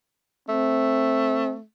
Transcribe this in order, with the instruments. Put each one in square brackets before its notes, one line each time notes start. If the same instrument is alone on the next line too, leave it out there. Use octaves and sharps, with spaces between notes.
[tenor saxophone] A3 [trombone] C4